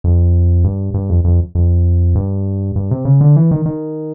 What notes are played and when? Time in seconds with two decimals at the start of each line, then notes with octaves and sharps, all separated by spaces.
0.04 F2
0.64 G2
0.94 G2
1.09 F2
1.24 F2
1.55 F2
2.15 G2
2.76 G2
2.91 C3
3.05 C#3
3.21 D3
3.36 E3
3.51 D#3
3.66 D#3